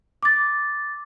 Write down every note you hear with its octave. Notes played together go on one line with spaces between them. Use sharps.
D6 A6